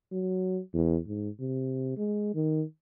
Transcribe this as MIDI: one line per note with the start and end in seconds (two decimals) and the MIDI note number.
0.12 0.60 54
0.74 0.98 40
1.07 1.30 44
1.40 1.96 48
1.97 2.31 56
2.35 2.63 51